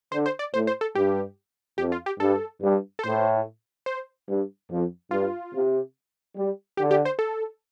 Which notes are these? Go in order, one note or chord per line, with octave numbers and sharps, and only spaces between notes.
D3 C5
C5
D5
A2 C5
C5
A4
G2 G4
F2 G4
F4
G4
G2 A4
G2
A4
A2 C5
C5
G2
F2
G2 F4
C3
G3
D3 G4
G4
C5
A4